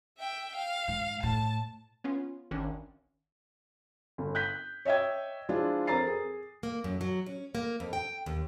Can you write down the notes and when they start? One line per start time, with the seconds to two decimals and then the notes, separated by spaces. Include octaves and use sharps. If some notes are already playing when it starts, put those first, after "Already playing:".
0.18 E5 G5
0.55 F5
0.88 G#2
1.23 A2 A5
2.04 B3 C#4 F4
2.51 G#1 D#3 C#4 D4
4.18 G1
4.35 F#6 G6 B6
4.85 C#5 D#5 E5 G5 G#6
5.49 F3 G#3 D4 E4 F4
5.87 F2 A#4 C5 A#5 A6 C7
6.07 G#4
6.63 A#3
6.84 F#2
7.01 F#3
7.26 C#4
7.55 A#3
7.80 F2
7.93 G5
8.26 D#2